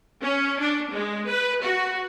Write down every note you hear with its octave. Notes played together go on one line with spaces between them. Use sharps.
C#4
D4
G#3
B4
F#4